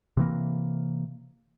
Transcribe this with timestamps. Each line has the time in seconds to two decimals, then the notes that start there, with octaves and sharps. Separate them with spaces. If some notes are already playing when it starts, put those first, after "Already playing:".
0.17 C3 E3 A#3